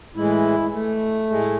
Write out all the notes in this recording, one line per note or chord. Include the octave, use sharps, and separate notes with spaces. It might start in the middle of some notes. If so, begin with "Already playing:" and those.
A2 E3 G#3 E4
A3
A2 G#3